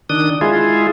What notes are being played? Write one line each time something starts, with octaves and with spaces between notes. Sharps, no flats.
D#3 D4 D#6
G#3 E4 F4 G#4